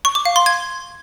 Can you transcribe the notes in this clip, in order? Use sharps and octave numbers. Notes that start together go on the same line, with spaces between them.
C#6
D6
F5
C6
G#6